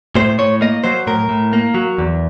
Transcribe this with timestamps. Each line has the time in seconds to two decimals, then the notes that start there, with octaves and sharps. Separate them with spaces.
0.15 A2 C5
0.39 A2 C#5
0.61 A#3 D#5
0.84 F#3 C5
1.07 A2 A#4
1.29 A2
1.53 A#3
1.74 F#3
1.98 E2